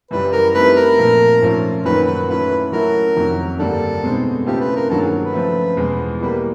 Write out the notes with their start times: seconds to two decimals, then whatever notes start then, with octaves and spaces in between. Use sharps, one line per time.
0.11 F#2 C#3 E3 G3 B4
0.32 A#4
0.54 A3 C4 D#4 G4 A#4 B4
0.76 A#4
0.97 A#2 F3 A3 C4
1.41 G#2 F3 A3 C#4 F4
1.85 F#2 D#3 F#3 A#3 D#4 B4
2.06 B4
2.28 E3 A3 C#4 F4 B4
2.72 F#3 A3 C#4 E4 A#4
3.16 F2 C3 D#3 F#3
3.59 G2 D3 G3 A#3 D4 A4
4.03 B2 G#3 C4 D#4
4.46 C#3 E3 A3 C4 F4 G4
4.61 B4
4.76 A#4
4.90 G2 D#3 F#3 A#3 A4
5.01 G#4
5.23 B4
5.33 C#3 F3 A3
5.77 E2 B2 G#3
6.21 E3 G3 A#3 B4